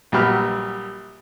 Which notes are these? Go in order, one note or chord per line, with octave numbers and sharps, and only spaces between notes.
A#1 F#3 G3 G4 B4 F6